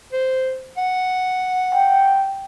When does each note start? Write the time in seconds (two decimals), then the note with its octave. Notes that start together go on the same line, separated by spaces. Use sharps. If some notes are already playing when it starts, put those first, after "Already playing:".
0.13 C5
0.77 F#5
1.74 G5